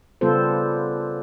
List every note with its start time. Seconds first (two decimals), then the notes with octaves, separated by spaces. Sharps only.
0.21 C#3 G3 B3 F4 A4 C5